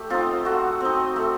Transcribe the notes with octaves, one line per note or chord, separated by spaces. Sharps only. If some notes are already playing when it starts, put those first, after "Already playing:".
Already playing: A3 G4
C4 D#4 F4
A3 F#4
C4 D#4
A3